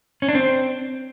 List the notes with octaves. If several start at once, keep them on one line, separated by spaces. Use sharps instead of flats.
C#4
D4
C4